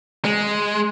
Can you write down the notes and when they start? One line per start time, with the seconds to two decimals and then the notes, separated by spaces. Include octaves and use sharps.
0.25 G#3